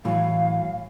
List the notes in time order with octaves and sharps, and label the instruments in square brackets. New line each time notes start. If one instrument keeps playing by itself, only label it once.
[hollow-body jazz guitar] A2 E3 F#3 [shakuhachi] F5